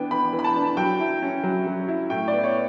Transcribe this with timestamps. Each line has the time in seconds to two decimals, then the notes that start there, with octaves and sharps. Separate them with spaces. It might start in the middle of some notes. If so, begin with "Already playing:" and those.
Already playing: E3 B3 D4 G5
0.11 E3 B5
0.33 E3
0.39 B5
0.44 A5
0.56 D4
0.77 F#3 G5
1.00 E4
1.22 C#4
1.43 F#3
1.67 F#3
1.89 E4
2.10 A2 G5
2.28 B3 D5
2.44 C#5